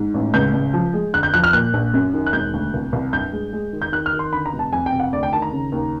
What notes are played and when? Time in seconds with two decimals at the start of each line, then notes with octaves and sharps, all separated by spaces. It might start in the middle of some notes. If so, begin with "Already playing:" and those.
Already playing: G#2
0.14 A1
0.34 C#2 G6
0.53 C#2
0.74 F3
0.94 G#3
1.13 D3 F#6
1.23 G6
1.34 F3 F#6
1.44 F6
1.53 A#2 F#6
1.74 A#1
1.94 F#2
2.14 D#3
2.26 F#6
2.33 E1 G6
2.53 D2
2.74 C2
2.93 C2
3.13 G2 G6
3.33 G#3
3.53 G#3
3.73 D#3
3.82 G6
3.92 D#3 F#6
4.06 F6
4.13 D#3
4.19 C6
4.33 D3 B5
4.46 A#5
4.53 F1
4.59 A5
4.73 F2 G#5
4.86 G5
4.92 C3
5.00 F#5
5.13 D2 D5
5.23 G5
5.32 D#3 A5
5.42 A#5
5.52 C#3
5.72 D#2